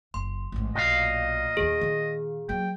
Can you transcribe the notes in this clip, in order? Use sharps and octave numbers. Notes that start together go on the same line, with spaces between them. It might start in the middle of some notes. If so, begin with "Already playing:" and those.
F#1 C6
A1 G#2
B1 A#2 D#5 F5
D#2 D#4 G#4
D#3
F#3 A#3 G5